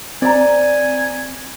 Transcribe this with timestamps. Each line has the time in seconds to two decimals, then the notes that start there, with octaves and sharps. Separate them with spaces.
0.22 C4 D5 G#5 A#5